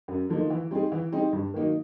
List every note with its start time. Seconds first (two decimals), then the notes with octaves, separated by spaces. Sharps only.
0.08 F#2
0.29 D3 F3 A#3 D#4
0.50 E3
0.71 G3 C4 D#4 G#4
0.92 E3
1.12 G3 C4 D#4 G#4
1.33 G2
1.54 D#3 F#3 A#3 D#4